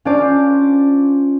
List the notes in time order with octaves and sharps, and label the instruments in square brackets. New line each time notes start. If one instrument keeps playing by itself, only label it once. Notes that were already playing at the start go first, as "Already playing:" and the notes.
[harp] C#4 D4 F4 C5 D5